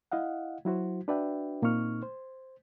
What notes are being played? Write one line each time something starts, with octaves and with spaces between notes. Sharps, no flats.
E4 D#5 F5 F#5
F#3 E4 F#4 C5
D4 F#4 B4 D5 E5 G5
A#2 A#3 C4 D#4 C#6 F6
C5